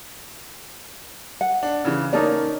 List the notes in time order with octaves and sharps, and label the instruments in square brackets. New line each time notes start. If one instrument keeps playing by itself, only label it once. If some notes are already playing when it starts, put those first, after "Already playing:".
[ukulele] F#5
[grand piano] D4
C#3 E3
[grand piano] A#3 C#4 [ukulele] D#4 A4 D5